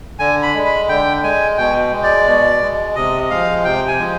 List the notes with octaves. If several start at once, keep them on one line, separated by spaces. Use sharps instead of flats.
D3 G#5
B5
G#3
B5
D3 G5
G#3 G#5
B2 G5
G#3
D5
B2
G#3
C3 D#5
F3 G#3 F5
C3 G5
G#5
F3 G#3